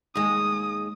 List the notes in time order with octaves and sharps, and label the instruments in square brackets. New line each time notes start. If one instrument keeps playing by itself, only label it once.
[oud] D#2 G#3 [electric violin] D#6